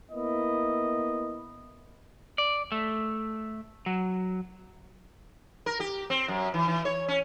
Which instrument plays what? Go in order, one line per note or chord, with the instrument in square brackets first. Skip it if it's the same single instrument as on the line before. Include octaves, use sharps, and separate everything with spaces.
[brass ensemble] A#3 B3 E4 D#5
[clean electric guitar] D5
A3
F#3
[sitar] A#4
G4
C4
F#2
E3
E3
C#5
C#4